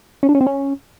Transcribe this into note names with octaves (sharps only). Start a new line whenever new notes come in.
C#4
D4
C#4
C4
C#4